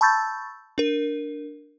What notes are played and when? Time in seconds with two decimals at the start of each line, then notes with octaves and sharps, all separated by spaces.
0.01 A5 B5 C#6 E6 G6 A6
0.78 D4 A#4